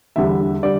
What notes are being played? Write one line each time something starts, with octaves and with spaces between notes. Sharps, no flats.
E2 D3 G3 E5
D3 G3 D5